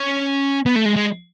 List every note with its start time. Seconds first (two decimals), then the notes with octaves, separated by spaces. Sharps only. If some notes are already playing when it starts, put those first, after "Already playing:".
Already playing: C#4
0.66 B3
0.76 A3
0.85 G#3
0.96 G#3